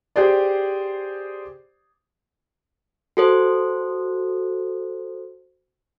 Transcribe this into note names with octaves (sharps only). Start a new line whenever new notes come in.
G4 G#4 C5 D5
F#4 A4 C5